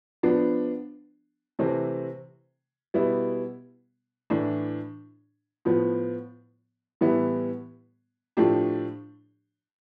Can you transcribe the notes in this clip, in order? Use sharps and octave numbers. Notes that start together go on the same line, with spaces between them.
F3 B3 D4
C3 E3 A3 C4
B2 G3 B3 E4
A2 E3 A3 D4
A2 F3 B3
A2 E3 G3 B3 E4
A2 F3 A3 D4 G4